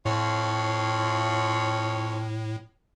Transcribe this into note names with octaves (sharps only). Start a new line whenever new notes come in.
F2 A2 F4 C#5